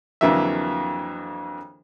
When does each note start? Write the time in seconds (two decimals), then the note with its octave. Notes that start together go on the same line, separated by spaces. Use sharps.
0.21 F2 D3 E3 F#3 A#3 E5